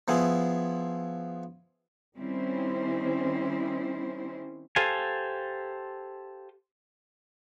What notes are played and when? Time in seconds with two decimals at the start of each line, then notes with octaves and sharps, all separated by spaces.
0.08 F3 B3 E4 G#4
2.17 D#3 G3 C4 C#4 E4 C5
4.76 G4 A4 C5 F5 G#5